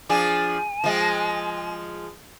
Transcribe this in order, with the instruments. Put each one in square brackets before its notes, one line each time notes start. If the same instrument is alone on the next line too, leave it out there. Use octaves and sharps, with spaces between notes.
[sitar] F3 D4 G#4 [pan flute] G#5
[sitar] F3 G#3